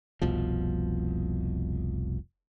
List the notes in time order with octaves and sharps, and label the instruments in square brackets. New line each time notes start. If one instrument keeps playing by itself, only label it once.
[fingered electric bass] F1 C2 B2 F3